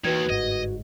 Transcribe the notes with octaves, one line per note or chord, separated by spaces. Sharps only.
D#2 D#3 E3 F#4 B4 G#6
G1 G#2 D#5